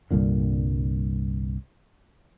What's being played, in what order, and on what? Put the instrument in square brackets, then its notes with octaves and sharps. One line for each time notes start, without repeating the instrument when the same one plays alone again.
[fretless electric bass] C2 G2 A#2 D3